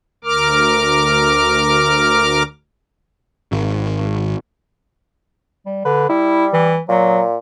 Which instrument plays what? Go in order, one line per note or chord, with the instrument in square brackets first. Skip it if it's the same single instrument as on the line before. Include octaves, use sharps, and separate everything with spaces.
[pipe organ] D2 A#4 D6 F6
[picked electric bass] G#1
[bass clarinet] G3
[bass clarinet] D3 [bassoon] B4
[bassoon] G3 [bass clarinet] E4
[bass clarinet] E3
[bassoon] A#2 [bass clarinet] F#3